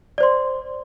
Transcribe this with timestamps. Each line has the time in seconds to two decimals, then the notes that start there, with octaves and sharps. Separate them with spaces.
0.18 D5
0.20 C5
0.23 C6